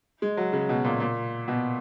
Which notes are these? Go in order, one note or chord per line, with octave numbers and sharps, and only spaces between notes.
G#3
F#3
C#3
B2
A#2
A#2
B2